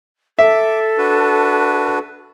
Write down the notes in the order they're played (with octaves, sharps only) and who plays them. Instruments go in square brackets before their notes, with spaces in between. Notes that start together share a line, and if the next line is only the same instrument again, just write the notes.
[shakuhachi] A4 [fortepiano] E5 [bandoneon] D6
[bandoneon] D4 F#4 B4